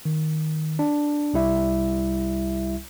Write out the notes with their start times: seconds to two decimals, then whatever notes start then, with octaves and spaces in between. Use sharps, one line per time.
0.05 D#3
0.79 D4
1.34 C2 G3 E4 E5